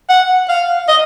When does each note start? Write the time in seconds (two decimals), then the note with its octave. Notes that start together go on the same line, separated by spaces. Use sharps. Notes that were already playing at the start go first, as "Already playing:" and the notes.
0.09 F#5
0.49 F5
0.88 D#5